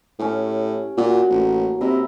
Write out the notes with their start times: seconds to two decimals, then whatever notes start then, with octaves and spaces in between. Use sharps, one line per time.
0.19 A2 C#4 G4
0.97 A#2 F#4
1.30 A1 A#3
1.81 C3 E4 D#5 A#5